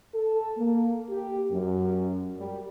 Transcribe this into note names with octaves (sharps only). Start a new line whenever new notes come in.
A4
A#3
G4
F#2
G3